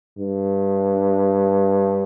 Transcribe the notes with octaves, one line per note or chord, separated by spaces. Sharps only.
G2